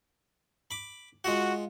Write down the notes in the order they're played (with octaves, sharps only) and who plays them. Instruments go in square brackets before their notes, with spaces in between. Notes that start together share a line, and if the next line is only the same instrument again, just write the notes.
[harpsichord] B5 D6
[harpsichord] G#3 F4 F#5 [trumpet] F#4